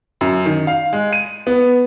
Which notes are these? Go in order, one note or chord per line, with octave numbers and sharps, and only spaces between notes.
F#2
D#3
F5
G#3
D#7
B3